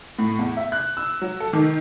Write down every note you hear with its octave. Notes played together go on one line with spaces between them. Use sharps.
A2
E2
E5
F#6
E6
F#3
A4
D#3